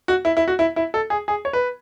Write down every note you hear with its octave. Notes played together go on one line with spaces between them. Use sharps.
F#4
E4
E4
F#4
E4
E4
A4
G#4
G#4
C#5
B4